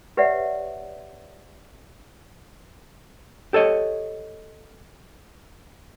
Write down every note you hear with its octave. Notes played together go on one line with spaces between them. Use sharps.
G4 B4 C#5 D5 E5 F#5
G4 A4 C#5 D#5